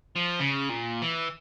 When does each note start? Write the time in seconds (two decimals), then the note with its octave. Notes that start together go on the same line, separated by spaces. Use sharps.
0.16 F3
0.40 C#3
0.70 A#2
1.02 E3